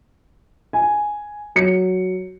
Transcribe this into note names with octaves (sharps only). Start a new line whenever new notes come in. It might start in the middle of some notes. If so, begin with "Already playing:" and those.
G#5
F#3 C#7